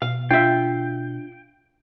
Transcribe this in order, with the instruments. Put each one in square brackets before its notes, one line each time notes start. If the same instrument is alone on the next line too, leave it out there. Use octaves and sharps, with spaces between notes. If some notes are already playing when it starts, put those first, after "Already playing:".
[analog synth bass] B2 [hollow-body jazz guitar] F5
[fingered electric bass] D4 [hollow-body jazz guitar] F4 E5 [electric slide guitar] G5